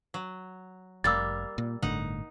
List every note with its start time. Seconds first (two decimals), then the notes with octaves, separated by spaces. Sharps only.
0.14 F#3
1.04 F1 G3 A#3 E6 A6
1.58 A#2
1.82 G1 A2 D3 D#4 F#5